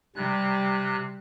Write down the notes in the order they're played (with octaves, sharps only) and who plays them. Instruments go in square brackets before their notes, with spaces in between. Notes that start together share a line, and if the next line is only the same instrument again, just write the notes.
[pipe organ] C3 F#6 [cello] G3